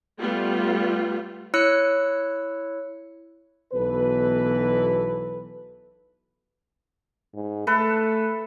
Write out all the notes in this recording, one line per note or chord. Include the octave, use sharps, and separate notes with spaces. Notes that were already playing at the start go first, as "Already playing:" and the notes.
G3 A3 B3 F4
E4 C#5 E6 F#6 C#7
B1 B2 E3 A4 B4
G#2
A3 A4 B4